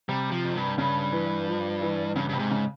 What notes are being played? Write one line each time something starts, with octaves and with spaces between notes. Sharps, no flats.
C3 G3
F3
F2
G2
G2 C#3
E3
F3
E3
G2 C#3
G2 C3
G#2
C#3